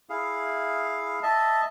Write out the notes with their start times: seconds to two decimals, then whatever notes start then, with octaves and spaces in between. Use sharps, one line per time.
0.10 E4 G#4 F5
1.23 D#5 E5 A5